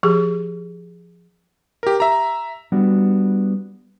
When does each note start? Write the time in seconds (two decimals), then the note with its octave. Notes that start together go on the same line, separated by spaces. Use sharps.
0.03 F3 G4 G#4
1.83 G4 A#4
2.00 E5 A#5
2.72 G3 B3 D4 F#4